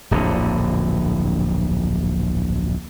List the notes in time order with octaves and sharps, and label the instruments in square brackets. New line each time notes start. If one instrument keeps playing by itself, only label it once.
[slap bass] D1 A#1 F2 D3